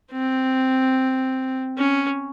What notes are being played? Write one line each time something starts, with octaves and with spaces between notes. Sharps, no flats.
C4
C#4